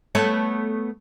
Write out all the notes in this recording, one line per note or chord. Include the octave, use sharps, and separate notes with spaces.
A3 B3 C#5